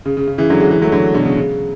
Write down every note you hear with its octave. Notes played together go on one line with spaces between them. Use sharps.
C#3
C#3
C#3
C#3 E3
D3 F#3
E3 G#3
E3 G#3
F#3 A3
D3 F#3
B2 D3
C#3
C#3